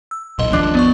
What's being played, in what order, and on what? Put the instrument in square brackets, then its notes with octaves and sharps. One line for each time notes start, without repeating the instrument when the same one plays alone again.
[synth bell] E6
[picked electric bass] D#1 B1 [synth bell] D#5 C6
[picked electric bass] G1 D#2 F3 [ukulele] D4
[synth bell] B3 D5 C#6